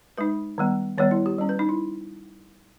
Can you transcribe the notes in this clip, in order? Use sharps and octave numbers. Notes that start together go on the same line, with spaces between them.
G#3 D#4 B4
D#3 G3 B3
D#3 G3 B3 C#5
E4
G4
G3 C#4
B4
D#4
E4